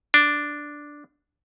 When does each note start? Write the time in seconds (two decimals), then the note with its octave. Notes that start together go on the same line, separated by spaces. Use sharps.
0.14 D4